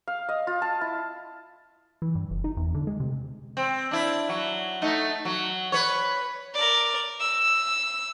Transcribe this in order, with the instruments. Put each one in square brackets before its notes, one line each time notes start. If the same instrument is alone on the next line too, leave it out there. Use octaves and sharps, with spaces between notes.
[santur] F5
D#5
F4
A5
E4
[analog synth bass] E3
G2
F#1
D#4
E2
D3
G#3
C3
[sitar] C4
D4 E4
F#3
A3 D#4
F#3
B4 C#5
[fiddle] A#4 D5
E6